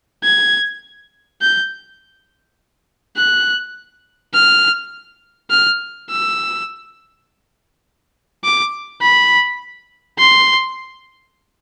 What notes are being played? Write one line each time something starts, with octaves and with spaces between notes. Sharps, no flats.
G#6
G6
F#6
F6
F6
E6
D6
B5
C6